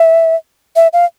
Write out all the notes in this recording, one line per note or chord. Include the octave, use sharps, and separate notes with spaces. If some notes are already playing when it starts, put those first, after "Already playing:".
Already playing: E5
E5
F5